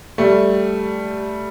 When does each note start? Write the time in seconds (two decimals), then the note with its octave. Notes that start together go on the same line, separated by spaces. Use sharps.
0.18 G3 A3